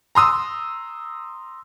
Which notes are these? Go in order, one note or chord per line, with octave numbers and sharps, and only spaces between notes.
A#5 C6 D#6 E6